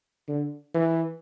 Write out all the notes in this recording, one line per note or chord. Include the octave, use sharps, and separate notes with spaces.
D3
E3